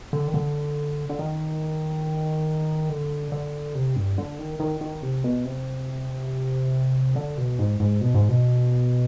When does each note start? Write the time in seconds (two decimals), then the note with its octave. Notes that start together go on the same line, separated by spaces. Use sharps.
0.13 D3
0.28 D#3
0.34 D3
1.09 D3
1.19 D#3
2.90 D3
3.32 D3
3.75 C3
3.96 G2
4.18 D3
4.39 D#3
4.60 D#3
4.81 D#3
5.03 C3
5.24 B2
5.45 C3
7.16 D3
7.38 B2
7.59 G#2
7.80 G#2
8.01 B2
8.15 G#2
8.29 B2